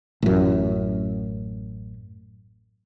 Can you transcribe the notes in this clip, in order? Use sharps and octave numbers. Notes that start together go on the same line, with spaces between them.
A1 F#2